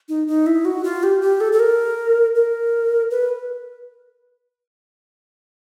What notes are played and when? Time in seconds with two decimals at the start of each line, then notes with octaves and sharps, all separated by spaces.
0.09 D#4
0.28 D#4
0.46 E4
0.65 F#4
0.84 F4
1.03 G4
1.22 G4
1.41 A4
1.52 A4
1.59 A#4
2.35 A#4
3.11 B4